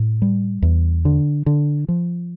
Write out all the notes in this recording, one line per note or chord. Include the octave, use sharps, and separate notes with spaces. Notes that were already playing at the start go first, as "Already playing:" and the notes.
Already playing: A2
G3
E2
D3
D3
F3